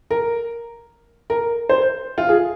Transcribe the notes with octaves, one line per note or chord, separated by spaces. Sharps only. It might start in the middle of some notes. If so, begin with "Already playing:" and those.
A#4
A#4
C5
F4
G#4